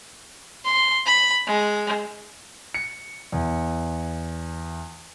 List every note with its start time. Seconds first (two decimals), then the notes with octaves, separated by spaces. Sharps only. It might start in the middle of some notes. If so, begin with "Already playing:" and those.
0.65 C6
1.06 B5
1.47 G#3
2.74 C#7
3.32 E2